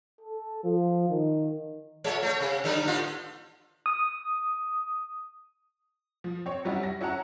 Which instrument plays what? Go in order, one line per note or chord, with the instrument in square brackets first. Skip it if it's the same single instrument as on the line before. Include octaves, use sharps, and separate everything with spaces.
[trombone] A4
F3
D#3
[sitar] A#2 G#3 C#5
A3 C#5
C3
D3 G3 D#4
A2 B3 F4
[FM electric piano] D#6
[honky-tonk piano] F3
C4 C#5
F#3 G3 C#4 E4 F#4
A#6
C#4 E4 F#4 F#5 A5 A#5